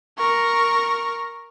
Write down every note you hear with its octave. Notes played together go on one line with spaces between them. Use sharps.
A#4 C#6